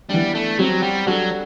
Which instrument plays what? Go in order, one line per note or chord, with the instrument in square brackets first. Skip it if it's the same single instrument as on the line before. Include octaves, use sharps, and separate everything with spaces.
[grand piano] E3 B3 D4 [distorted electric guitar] G3
[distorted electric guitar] A3
[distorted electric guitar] F#3 [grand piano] G3 C4 F#4
[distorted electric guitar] G3
[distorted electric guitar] F#3 [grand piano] G3 D4 F#4 A4